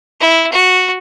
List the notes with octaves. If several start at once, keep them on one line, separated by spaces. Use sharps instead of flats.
E4
F#4